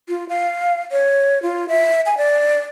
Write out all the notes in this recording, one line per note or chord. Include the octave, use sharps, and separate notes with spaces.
F4
F5
C#5
F4
E5
G#5
D5